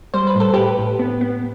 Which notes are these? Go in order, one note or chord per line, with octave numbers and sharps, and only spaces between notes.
G3 C5
B4
A2 A4
A2 G4 B4
A2
B3
B3